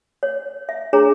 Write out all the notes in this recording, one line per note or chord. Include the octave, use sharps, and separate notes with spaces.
C#5
E5
D4 G#4 C#5 A#5